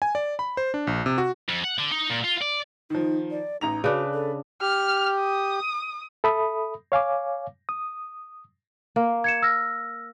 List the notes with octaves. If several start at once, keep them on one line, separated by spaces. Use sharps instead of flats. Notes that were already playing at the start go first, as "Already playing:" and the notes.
G#5
D5
B5
C5
D4
A#1
C3
F#4
F2
F#5
D3
D#4
A#2
F4
D5
D#3 F3 D#4
D5
A1 D#4 A#5 F7
C#3 D4 F#4 B4
A4
G4 F6
D#6
A4 E5 B5 D#6
C#5 F5 G#5 D6
D#6
A#3
G#6 C#7 E7
E6 F6 A#6